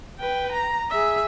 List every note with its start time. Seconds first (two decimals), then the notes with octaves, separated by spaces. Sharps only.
0.19 B4 G5
0.52 A#5
0.91 G#4 E5